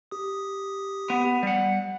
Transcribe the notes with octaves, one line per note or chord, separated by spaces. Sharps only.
G4 D#6
B3
G3 F#5